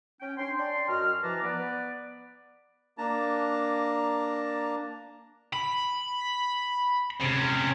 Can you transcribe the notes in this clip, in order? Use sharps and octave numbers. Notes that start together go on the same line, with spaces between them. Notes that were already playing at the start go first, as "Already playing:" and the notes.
C#4 G5
C#4 D4 G5 C6
D5 G5 A5 C6
F#2 F#4 D#5 F6
E3 F3 B4 A5 A#5 D6
B3 B4 D5
A#3 D4 A5 A#5
B5
C3 C#4